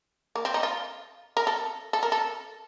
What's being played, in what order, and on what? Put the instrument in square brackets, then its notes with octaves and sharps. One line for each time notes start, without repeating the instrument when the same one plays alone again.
[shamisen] A#3
C4
D#4
F4
A#4
A4
A4
A#4
A4